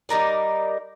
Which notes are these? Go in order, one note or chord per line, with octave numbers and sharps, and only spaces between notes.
G3 D#4 A#4 D5